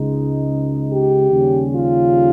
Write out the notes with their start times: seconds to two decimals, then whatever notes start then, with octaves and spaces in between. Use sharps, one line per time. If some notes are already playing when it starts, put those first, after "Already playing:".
Already playing: C#2 C#3 G#3 D#4
0.90 G4
1.32 D#2 C#3 G3 C#4
1.74 F4